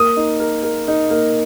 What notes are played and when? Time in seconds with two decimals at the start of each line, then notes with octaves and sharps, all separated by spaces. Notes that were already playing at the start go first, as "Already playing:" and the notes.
Already playing: A#3 D#6
0.17 D#4
0.40 A#4
0.63 A#4
0.88 D#4
1.10 A#3